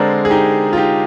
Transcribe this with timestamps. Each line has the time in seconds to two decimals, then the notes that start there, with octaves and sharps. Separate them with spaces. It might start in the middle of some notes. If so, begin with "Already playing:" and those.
Already playing: D3 G#3 C4 A#4 D5
0.25 G#4
0.30 D#4 G4
0.73 F4
0.77 D#4 G4